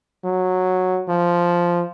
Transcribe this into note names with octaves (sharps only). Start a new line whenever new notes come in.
F#3
F3